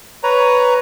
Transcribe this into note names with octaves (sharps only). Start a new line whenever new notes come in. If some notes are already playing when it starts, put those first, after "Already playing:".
B4 C#5 A#5